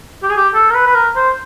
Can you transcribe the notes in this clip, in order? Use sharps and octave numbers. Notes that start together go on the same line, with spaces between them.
G4
G#4
G4
A4
A#4
B4
B4
A#4
C5